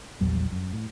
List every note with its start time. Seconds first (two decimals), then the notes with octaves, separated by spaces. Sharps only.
0.21 A#1 E2 F#3 G3
0.52 F#2
0.73 A2